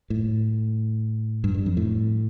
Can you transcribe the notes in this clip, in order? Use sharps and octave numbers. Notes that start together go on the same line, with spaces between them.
A2
G2
G2
F2
A2